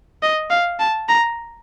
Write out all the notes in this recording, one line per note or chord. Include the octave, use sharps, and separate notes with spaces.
D#5
F5
A5
A#5